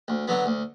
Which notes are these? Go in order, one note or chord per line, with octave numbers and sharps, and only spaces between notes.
D2
D3 F#3 B3
D2